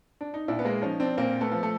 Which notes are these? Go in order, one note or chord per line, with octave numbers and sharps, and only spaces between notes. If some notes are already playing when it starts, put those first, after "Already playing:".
D4
D#4
A#2 D4 E4
B3
G#3 A#3
F3 C#4 D#4
C4 D4
A#2 A#3 C4
A3 B3
F3
A3